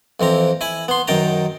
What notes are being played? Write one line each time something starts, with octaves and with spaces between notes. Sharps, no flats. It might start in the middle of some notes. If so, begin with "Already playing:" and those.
F2 E3 C4 A#5
E4 G#5 B5
B3 C6
F#2 D#3 G5 A5 A#5